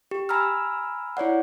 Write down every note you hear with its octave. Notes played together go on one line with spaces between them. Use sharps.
G4
G#5 A#5 B5 E6 F6
E4 C#5 D5 F#5